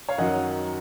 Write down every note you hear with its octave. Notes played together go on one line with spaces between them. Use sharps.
C#5 F5
F#2 D#3 F#3 D#5 F#5